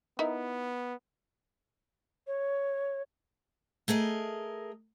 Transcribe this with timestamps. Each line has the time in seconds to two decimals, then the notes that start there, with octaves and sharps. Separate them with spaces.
0.19 B3 D#4 E4 A#4
2.27 C#5
3.88 A3 G#4 A#4 D#5